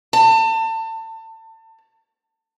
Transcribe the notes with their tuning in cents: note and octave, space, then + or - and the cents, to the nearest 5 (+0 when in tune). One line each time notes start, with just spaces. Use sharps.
A5 +30